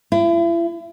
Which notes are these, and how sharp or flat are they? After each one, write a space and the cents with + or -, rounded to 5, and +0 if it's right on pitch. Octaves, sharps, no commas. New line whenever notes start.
E4 +40